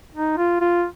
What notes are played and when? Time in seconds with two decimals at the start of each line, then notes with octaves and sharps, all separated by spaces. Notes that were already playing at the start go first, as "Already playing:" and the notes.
0.14 D#4
0.37 F4
0.61 F4